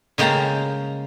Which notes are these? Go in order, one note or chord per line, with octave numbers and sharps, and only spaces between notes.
C#3 G#3 A#3 G5 A5 A#5